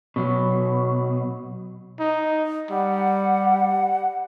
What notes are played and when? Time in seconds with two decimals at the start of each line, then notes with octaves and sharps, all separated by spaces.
0.16 B2 F#3
2.00 D#4
2.71 G3 F#5